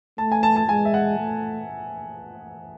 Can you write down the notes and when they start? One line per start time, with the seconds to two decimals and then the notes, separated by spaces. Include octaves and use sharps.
0.18 A3 A5
0.32 G#5
0.43 A5
0.56 A5
0.69 G#3 G#5
0.85 E5
0.94 F#5
1.18 A3